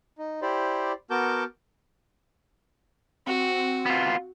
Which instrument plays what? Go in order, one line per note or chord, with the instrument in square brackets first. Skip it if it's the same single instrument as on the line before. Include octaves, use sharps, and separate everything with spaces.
[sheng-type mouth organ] D#4
E4 G4 C5 D5
B3 F#4 A#4 A5 D6 G6
[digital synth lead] C4 [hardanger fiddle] F#4
[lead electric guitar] B3 F4